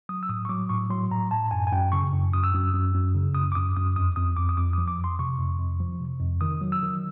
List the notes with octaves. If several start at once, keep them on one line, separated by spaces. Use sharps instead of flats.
F#3 D#6
E6
A2 D#6
C#6
F#3 D6
A2 C#6
F#3 C6
A2 A#5
A2 A5
F#2 G#5
G#5
F#2 G5
C#3 C#6
F#2
F#2 D#6
E6
F#2
F#2
F#2
C#3
F#2 D#6
D6
F#2 D#6
F#2 D#6
F2 D#6
F2 D#6
F2 D6
D#6
F2 D6
F3 D#6
D6
F2
C6
C3 C#6
F2
F2
F3
C3
F2
D#3 D#6
F#3
E6
D#3